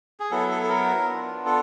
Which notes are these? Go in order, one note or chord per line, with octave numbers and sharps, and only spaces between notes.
G#4
F#3 B3 E4 A4
A4
A4
A#4
B3 D4 F4
A4